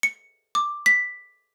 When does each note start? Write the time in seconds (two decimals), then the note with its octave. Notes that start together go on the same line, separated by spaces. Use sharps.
0.03 C#7
0.55 D6
0.86 B6